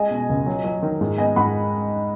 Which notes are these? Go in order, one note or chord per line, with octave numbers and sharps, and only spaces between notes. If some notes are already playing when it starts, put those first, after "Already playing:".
Already playing: G#3 D#5 G#5
B2
C#2
F#3
F#3
D#3
G#2
B3 D#5 G#5
G#2 F#5 B5